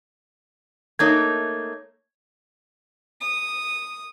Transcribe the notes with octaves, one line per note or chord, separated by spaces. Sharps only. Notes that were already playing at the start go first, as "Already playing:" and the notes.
A3 A#3 D#4 C#5 G#6
D#6